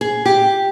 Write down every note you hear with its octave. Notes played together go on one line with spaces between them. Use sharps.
G#4
G4